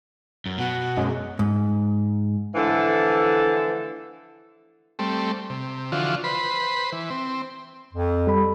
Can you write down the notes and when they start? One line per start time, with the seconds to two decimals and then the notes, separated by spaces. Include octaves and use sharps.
0.46 F#2
0.58 B2 F#4
0.97 F#2 G#3
1.39 G#2
2.55 D3 E3 F3 A3 A4
4.99 G3 A3 C4
5.50 C3
5.92 D3 E3 F3 F4 F#4
6.24 B4 C5 B5
6.92 E3
7.10 C4
7.94 F2
8.27 G3 A4 B5